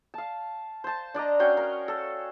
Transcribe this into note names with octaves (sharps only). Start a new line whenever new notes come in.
F5 A5
C5 A5
D4 D5 D#5 A#5
C#4 F#4 F5 G5
A#4
A4